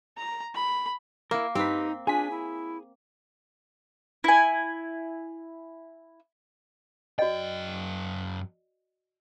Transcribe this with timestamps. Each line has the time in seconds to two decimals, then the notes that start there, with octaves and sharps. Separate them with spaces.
0.18 A#5
0.55 B5
1.31 A#3 E4 A#4
1.55 G2 C4 D#4 G4 B4 B6
2.07 D4 F4 G#4 G#5 B6
2.31 E4
4.24 E4 G#5
7.19 F#2 F#4 D5 D#5 G5